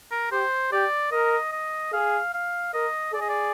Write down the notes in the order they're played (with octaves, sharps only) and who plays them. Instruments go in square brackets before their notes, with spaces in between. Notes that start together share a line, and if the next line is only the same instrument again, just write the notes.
[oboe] A#4
[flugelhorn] G4 [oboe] C5
[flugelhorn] G4 [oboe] D5
[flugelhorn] A#4 [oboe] D#5
[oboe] D#5
[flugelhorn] G#4 [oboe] F5
[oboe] F5
[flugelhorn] A#4 [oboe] D#5
[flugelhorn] G#4 [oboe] D5
[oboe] D#5
D5